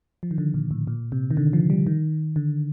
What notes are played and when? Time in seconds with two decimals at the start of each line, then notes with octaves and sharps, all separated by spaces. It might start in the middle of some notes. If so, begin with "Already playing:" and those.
0.23 F3
0.31 D#3
0.38 D3
0.54 A#2
0.71 A2
0.87 A#2
1.12 C3
1.31 D#3
1.37 D3
1.53 F3
1.70 G3
1.87 D#3
2.36 D3